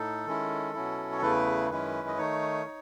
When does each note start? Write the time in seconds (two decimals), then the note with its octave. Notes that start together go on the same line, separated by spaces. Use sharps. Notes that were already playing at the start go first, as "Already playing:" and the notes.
Already playing: A2 D#4 A4
0.26 D#3 G#3 C#4 E4
0.74 B2 F#3 C#4 E4
1.12 C#5
1.22 E2 C#3 E3 A3 E4 B4
1.70 F#2 D#3 G#3 C#4 E4 B4
2.08 D#5
2.17 D#3 A3 D#4 C#5
2.66 D#4